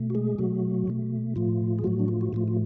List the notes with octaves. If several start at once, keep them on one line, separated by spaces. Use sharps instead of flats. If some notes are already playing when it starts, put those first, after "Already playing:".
Already playing: B2 A3
F#4
G#3 G#4
B2 F#3 A3 F#4
B2 A3
A2 F3 A3 F4
G#4
A2 F3 F#3 A3 F#4
D4
F4
F#4
A2 F3 A3 F4
F4